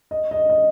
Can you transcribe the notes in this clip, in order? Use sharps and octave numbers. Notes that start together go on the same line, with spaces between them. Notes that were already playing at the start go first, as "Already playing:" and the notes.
D#5
D#5
D#5